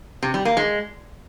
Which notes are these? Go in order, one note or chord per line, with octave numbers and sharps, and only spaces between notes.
C3
G3
A#3
G#3